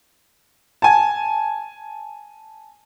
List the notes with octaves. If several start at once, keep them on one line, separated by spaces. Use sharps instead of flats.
G#5 A5